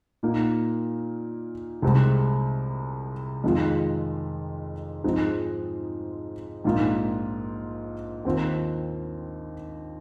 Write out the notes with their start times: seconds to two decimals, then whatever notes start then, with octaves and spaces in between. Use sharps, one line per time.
0.23 A#2 A#3 D#4
1.82 C2 C3 G#3 C4
3.44 F2 D#3 G#3 F4
5.04 G#2 F3 G#3 C4 D#4
6.64 A#1 G#2 F3 A#3 F4
8.25 D#2 D#3 C4 F4